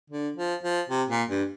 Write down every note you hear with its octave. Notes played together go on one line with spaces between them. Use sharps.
D3
F3
F3
C3
A#2
G2